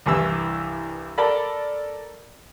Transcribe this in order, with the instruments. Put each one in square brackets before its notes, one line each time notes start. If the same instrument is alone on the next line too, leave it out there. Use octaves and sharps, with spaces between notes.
[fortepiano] C2 G2 E3 E4 E6
A4 A#4 D5 B5